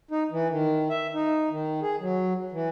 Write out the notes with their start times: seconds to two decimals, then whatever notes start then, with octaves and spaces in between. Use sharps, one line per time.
0.11 D#4
0.31 E3
0.50 D#3
0.90 E5
1.14 D#4
1.50 D#3
1.82 G#4
2.00 F#3
2.52 E3